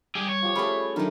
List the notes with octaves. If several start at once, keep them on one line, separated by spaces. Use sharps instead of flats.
G3 G4 G#4
C#5
F3 G4
G3 A3 C#4 G#4 A4 B5 C#6
D#3 F#3 A3 D4 D#4 A#4